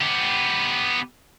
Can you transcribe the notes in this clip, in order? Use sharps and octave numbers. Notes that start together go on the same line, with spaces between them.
B3 G4